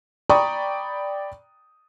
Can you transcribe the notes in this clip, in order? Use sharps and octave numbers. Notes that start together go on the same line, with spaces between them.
D5 G5 A#5 B5 C#6 D#6